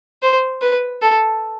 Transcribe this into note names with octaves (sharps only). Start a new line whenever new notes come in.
C5
B4
A4